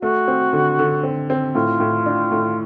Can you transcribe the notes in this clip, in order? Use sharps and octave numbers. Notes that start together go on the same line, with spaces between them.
A3 F#4
C4
D3
D3
C4
C4
A2 F4
A2
D4
A2